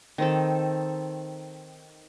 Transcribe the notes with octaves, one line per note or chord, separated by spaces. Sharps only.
D#3 C4 A4